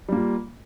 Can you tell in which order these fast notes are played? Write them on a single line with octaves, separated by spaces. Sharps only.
G3 A#3 F4